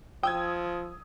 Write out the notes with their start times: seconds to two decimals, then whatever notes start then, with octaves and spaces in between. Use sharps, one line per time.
0.23 F3 G5 D#6 E6 G#6